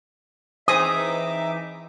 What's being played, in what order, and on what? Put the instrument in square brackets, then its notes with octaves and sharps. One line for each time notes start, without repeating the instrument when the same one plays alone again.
[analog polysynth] E3 D#4 D6 [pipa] C4 G#4 [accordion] E5 [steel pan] D#6